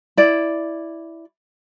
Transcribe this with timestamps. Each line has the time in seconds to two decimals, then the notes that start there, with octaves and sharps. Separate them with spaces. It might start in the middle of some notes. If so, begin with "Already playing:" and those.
0.17 E4 D5